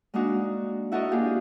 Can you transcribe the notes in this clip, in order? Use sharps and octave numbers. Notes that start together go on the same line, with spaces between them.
G#3 A#3 D4 D#4 F#4
E4 F#4 A4 A#4 D#5
A#3 D4 F4 G4 G#4